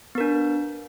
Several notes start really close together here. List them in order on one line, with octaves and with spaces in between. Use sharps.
B3 A#4 D4